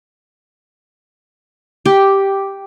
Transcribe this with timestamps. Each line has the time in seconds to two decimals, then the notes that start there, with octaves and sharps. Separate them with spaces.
1.86 G4